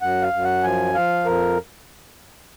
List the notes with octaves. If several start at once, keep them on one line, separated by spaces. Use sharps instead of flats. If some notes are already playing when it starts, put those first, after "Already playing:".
F#2 F#5
F5
F#2
F#5
F3 G#5
F3 F5
F2 A#4